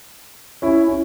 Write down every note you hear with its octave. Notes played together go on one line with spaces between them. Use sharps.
C#4 E4
C#4 E4